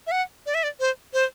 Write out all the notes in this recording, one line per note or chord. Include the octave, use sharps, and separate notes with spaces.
E5
F#5
D5
E5
D5
C5
C5